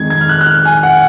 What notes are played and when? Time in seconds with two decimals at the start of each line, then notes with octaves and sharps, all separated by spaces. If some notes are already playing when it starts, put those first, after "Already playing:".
Already playing: F2 D#3 G#3 G#6
0.10 G#6
0.21 F6
0.29 F#6
0.41 F#6
0.46 F6
0.65 G#5
0.83 F#5